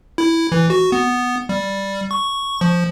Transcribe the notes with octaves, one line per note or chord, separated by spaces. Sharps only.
E4
E3
F#4
B3
G3
C#6
F3